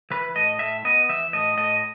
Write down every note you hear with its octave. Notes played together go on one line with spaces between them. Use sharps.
E3 B4
A2 D#5
A2 E5
B3 D#5
E3 E5
A2 D#5
A2 D#5